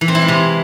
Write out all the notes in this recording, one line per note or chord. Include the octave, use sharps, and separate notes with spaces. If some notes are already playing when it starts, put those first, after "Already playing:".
E3
C4
E4
G#3
C3